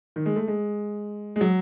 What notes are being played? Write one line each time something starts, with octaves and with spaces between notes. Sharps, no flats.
D#3
G#3
A3
G#3
G#3
F#3